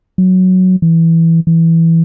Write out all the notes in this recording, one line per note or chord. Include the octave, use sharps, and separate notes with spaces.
F#3
E3
E3